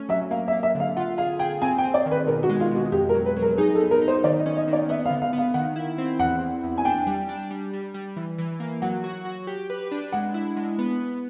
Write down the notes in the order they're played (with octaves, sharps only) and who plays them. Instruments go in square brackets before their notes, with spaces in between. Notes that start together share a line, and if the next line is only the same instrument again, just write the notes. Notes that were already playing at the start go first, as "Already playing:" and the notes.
Already playing: [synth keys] A3 C#4
[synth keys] F#3 [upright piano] E5
[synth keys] A#3 [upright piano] F5
[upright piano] E5
[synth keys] A#3
[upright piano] E5
[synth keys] D3
[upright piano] F5
[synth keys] F4 [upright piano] F#5
[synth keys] G#4 [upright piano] F5
[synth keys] G#4 [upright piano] G5
[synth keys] C4 [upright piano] G#5
[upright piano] G5
[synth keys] C4
[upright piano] D5
[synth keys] D#3
[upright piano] B4
[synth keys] B2 [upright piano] A#4
[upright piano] F#4
[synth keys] G#3
[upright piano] F4
[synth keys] B2 [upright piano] F#4
[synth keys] F2 [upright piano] G4
[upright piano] A#4
[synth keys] F#3
[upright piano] B4
[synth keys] F#3
[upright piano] A#4
[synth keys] D#4 [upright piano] G#4
[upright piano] A4
[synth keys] B3
[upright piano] A#4
[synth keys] D#4
[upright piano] C5
[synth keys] D#3 [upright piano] D5
[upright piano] D#5
[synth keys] C#4
[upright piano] D#5
[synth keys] D#3
[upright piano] D5
[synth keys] B3 [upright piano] E5
[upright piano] F5
[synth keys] D3
[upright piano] F5
[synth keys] B3
[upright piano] F5
[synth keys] D#3 [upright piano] F#5
[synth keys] E4
C4
[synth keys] E2 [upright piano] F#5
[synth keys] E2
E2
[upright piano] G#5
[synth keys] D4 [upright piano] G5
[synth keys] G3
D4
G3
G3
G3
E3
E3
A#3
[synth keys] F#3 [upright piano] F#5
[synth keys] F#4
F#4
G4
B4
D4
[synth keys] G#3 [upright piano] F#5
[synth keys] E4
G#3
B3
B3